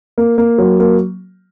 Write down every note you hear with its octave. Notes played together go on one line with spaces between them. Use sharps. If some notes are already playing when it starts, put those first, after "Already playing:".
A#3
A#3
F#3
A#3